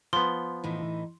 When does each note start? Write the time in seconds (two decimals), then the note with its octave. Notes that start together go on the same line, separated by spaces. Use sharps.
0.13 F3 B3 C6
0.64 A2 E3 D#4